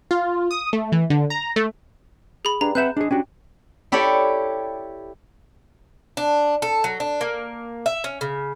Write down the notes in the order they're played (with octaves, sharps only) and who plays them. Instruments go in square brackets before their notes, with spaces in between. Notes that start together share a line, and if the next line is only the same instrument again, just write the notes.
[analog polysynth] F4
D#6
A3
E3
D3
A#5
A3
[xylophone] G#4 B5
[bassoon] G2 [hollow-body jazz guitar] D4 G#4 [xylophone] A#5
[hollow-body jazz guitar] C4 E5 F#5 [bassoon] B4 [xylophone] F#6 G6 E7
[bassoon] G#3 [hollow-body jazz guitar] D4 G#4
[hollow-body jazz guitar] C#4 D4 F#4 [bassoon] G4
[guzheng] E4 G4 A4 C#5 D5
[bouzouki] D4
A4
F#3
D4
A#3
E5
C#4
C#3